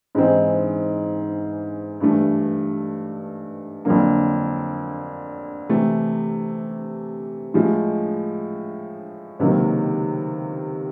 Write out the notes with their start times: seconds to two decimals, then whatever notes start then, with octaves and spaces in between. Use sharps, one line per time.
0.15 G#2 E3 G#3 C4 E4
2.00 G2 E3 A3
3.85 F2 D3 F#3 A#3
5.69 C3 E3 A3
7.54 A2 F3 G#3
9.39 C#2 C3 D#3 F#3 A#3